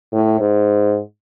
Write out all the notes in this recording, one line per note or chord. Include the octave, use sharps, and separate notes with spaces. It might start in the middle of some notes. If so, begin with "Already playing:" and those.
A2
G#2